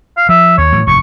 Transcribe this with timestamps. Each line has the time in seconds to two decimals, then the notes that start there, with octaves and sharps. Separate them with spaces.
0.17 F5
0.29 F3 E5
0.58 D#2 C#5
0.72 A2 E3 F#3
0.87 F1 E2 G#2 C#6